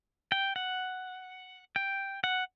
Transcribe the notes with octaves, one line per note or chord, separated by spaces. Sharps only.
G5
F#5
G5
F#5